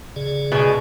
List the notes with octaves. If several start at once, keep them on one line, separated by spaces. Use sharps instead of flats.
C#3 G#4 D5
B2 G#3